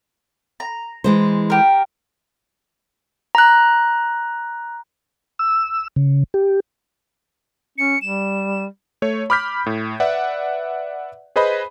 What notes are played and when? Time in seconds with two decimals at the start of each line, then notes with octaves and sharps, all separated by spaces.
0.60 A#5
1.04 E3 G#3 C5
1.50 G4 A#4
3.35 A#5 F#6
5.39 E6
5.96 C#3
6.34 G4
7.78 C#4 C#7
8.02 G3 E7
9.02 A3 C#5
9.30 B5 D6 F6 G6 B6
9.66 A2
10.00 B4 D5 E5 F#5
11.36 G#4 B4 C5 D#5 B5